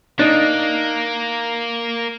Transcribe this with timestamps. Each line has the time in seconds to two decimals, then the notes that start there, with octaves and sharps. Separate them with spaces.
0.19 A#3 D4 D#4